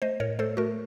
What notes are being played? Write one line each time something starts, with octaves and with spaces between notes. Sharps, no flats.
A3 C5 D#5
A2 A#4 C#5
A3 A4 C5
A3 F#4 A#4